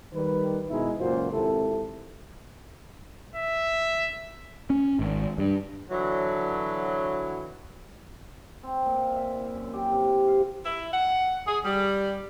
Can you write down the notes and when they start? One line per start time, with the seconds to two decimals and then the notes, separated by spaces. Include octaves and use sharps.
0.13 D#3 G3 B4
0.69 B2 D#3 G#3 D#4 E4
0.99 C#2 F#2 A#2 F4 F#4 C5
1.31 G#1 C3 E4 A4
3.36 E5
4.70 C#4
4.99 G#1
5.38 G2
5.90 D3 E3 F#3
8.63 C4
8.86 A#2
9.16 E5
9.35 E4
9.56 F#2
9.73 G4
9.92 C3
10.04 C3
10.28 F5
10.64 E4
10.91 F#5
11.46 G#4
11.64 G3